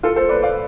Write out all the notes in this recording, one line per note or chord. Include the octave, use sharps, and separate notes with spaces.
F4 A4
A4 C5
B4 D5
D5 F5